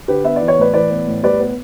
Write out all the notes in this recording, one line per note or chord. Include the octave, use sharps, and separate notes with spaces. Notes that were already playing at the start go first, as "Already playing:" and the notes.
D3 G4 B4
B3 E5
E3 D5
C#5
A2 B4 D5
E3 B4 D5
B3
A2
G3 B4 D5
B3